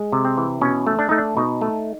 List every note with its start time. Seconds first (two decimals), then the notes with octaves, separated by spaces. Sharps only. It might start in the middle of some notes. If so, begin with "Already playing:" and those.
Already playing: G#3
0.12 C3
0.25 C4
0.38 E3
0.61 B2 C#4
0.87 A3
0.99 D4
1.09 A3 D#4
1.18 D4
1.37 B2 D#4
1.61 A3